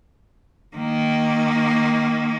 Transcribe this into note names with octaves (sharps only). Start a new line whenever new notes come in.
D#3 A#3